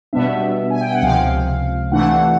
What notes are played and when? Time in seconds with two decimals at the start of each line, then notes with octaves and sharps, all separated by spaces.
0.13 B2 G3 B3 D4 E5
0.71 G#5
0.81 G5
0.92 F#5
1.02 C#2 C3 F3 F5
1.92 C3 E3 A3 D4 F#5